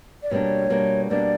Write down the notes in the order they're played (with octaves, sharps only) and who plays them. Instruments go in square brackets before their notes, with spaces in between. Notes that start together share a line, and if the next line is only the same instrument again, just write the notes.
[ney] D5
[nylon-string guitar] B2 G3 A#3 D4 [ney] C#5
[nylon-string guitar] B2 G3 A#3 D4
[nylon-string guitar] B2 G3 A#3 D4 [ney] D5